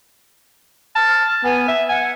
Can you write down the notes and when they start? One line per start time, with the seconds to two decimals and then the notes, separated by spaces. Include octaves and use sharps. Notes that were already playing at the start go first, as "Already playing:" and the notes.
0.96 A5 F6
1.44 B3 G#5
1.68 E5
1.89 F#5 G#5